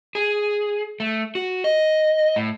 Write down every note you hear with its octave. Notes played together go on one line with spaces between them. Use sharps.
G#4
A3
F#4
D#5
A2